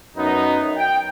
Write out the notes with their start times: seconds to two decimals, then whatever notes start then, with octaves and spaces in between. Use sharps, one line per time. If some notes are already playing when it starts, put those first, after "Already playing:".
0.17 F#2 B3 D#4
0.77 G5